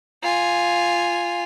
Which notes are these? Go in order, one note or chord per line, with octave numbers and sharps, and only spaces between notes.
F4 G#5